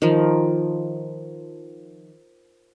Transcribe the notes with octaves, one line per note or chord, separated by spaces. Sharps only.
D#3 F3